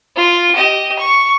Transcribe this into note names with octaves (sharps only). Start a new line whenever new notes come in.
F4
G4 D#5
C#6